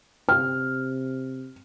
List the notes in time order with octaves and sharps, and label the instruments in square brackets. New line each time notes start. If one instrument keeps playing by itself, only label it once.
[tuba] C3 [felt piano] F6